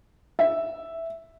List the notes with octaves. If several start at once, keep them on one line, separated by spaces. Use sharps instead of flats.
E5